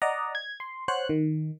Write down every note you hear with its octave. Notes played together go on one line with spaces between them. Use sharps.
D5 D#5 F#5 A#5
G#6
C6
C5 C#5 F#5 F#6
D#3